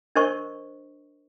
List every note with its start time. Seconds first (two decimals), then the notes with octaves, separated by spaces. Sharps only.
0.15 D4 A#4 C5 D#5 C#6